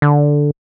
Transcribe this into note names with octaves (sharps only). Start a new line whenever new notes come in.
D3